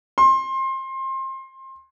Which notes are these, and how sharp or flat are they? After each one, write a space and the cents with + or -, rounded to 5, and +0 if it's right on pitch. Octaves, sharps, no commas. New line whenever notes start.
C6 +25